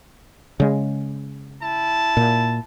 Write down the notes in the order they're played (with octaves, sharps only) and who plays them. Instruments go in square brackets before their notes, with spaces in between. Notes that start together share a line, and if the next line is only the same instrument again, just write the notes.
[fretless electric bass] C#3 G#3
[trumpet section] E4 A5
[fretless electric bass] A#2